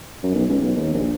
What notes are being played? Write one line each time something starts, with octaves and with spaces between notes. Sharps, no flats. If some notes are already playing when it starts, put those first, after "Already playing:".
F#2
B1
C#2
B1
D#2
A#1